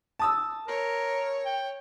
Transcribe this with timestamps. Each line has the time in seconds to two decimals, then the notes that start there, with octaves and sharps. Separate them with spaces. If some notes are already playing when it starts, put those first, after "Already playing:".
0.19 A5 D#6 E6
0.68 A#4 C#5
1.45 G5